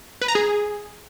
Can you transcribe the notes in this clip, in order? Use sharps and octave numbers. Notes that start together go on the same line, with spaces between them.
B4
A#5
G#4